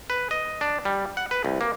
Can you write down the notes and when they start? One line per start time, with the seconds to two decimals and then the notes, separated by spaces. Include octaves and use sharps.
0.10 B4
0.31 D#5
0.61 D4
0.85 G3
1.17 F#5
1.31 B4
1.45 C2
1.61 A#3